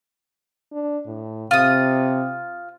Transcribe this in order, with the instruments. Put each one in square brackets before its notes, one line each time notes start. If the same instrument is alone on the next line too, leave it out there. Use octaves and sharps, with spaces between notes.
[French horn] D4
A2
[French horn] C3 [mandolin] F4 D#6